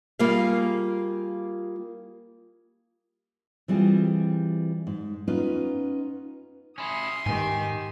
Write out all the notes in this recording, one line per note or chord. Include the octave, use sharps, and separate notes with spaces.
G3 A#3 F4 G#4 F5
E3 G3 C4 F4 G#4
G#2
B3 C#4 D#4 F4 B4 D#5
C#4 E4 C6 D#6
G#2 D#3 G4 G#5